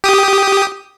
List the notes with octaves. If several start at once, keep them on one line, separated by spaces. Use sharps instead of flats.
G4 D#6